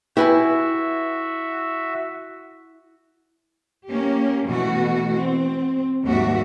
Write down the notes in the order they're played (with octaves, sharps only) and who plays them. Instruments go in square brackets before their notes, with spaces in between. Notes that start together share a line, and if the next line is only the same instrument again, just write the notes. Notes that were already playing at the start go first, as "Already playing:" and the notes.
[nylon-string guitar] E4 [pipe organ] F#4 E5 [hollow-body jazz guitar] G4 B4 G#5
[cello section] A#3 C#4 G4
B2 E3 A3 F#4
C4
D#2 G#2 G3 F#4 E5